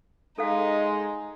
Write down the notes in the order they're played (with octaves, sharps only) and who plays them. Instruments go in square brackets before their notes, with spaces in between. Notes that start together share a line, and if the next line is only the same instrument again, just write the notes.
[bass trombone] G#3 [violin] D#4 [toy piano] A4 F5